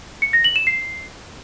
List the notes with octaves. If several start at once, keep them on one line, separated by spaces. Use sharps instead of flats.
C#7
A#6
F#7
E7
C7